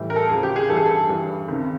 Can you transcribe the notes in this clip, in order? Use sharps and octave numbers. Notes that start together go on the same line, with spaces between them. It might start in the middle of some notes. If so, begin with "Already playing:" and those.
Already playing: A2 E3 G3
A#4
A4
D#2 C#3 F3 G#4
G4
G#4
G2 E3 G3 A4
G#4
A4
G2 E3 G3
C#2 C3 D#3